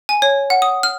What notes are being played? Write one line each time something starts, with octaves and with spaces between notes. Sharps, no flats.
G#5
C#5
F#5
D#6
F6